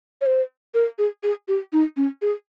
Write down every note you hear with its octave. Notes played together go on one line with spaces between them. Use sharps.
C#5
C5
A#4
G#4
G#4
G4
D#4
C#4
G#4